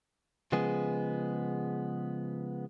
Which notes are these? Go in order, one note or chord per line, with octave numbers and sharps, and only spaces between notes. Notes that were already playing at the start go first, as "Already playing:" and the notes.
C#3 F3 G#3 B3 G#4